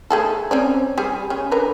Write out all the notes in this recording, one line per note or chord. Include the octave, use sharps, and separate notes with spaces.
A3 G#4 A4
C4 C#4 D5
G3 G#4
C#3 C#4
D3 A#4 B4